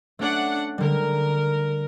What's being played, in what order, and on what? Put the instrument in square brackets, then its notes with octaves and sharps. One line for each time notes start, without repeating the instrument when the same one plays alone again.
[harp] A3 C#4 [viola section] D4 F#5
[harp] D3 G3 [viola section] A#4